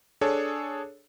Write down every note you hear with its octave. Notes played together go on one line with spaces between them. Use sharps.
D4 G#4 A4 C#5